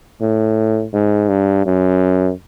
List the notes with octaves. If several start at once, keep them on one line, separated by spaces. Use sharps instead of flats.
A2
G#2
G2
F#2